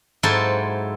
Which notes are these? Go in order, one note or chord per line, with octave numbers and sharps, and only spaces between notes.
G#2 F#3 E4 F4 A4 C5